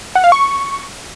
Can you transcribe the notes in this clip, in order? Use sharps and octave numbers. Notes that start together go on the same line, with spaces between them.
F#5
F5
C#6